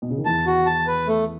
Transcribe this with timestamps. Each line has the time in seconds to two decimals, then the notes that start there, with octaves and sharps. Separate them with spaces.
0.02 B2
0.10 C#3
0.18 D#3
0.25 E2 E3 A5
0.46 F#4
0.66 A5
0.87 B4
1.07 A3